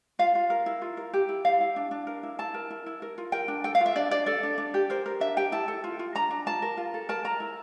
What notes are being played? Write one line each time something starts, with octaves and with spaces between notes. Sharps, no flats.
F4 F5
F4
A#4
E4
F4
A#4
G4
E4
E4 F5
E4
D4
D4
A#4
E4
E4 A5
A#4
E4
E4
A#4
F4
A#4 G5
D4
A4 G5
F5
F4
E5
D4 D5
D4 D5
A4 D5
D4
D4
G4
A#4 C5
A#4
D4 E5
G4 G5
E4 A5
A4
F4
F4
D4 A#5
D4
F4 A5
A#4
F4
A4
A#4 A5
A#4 A#5
E4